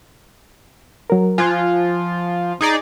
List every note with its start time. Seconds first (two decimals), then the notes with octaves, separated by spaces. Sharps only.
1.10 F#3 A#4
1.38 F3 F4 G#5 F#6 G#6
2.61 D#4 G#4 D5